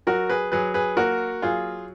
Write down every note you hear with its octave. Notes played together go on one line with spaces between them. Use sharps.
F#3 F#4 A#4
G#4 B4
F#3 G#4 B4
G#4 B4
A#3 F#4 A#4
F#3 F4 G#4